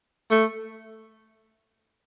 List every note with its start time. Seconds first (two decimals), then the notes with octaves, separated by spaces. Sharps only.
0.30 A3